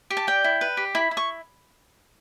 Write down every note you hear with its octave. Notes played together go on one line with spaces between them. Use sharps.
G4
A5
D5 G5
E4
B4
G4
E4 B5
E4
C#6